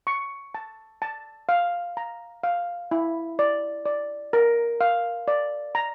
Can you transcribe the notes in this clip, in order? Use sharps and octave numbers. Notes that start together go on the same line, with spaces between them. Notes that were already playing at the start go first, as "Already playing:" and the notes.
C#6
A5
A5
F5
A#5
F5
E4
D5
D5
A#4
F5
D5
A#5